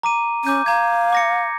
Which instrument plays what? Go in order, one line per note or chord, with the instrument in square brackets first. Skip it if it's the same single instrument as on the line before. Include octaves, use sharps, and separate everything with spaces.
[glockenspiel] A#5 D6 D#7
[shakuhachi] C#4 [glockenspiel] D6 G6 D#7
[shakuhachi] F5 [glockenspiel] A#5 G#6
[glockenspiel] D6 A#6 C#7